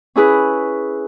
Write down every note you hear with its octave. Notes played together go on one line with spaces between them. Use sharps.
C#4 E4 G#4 B4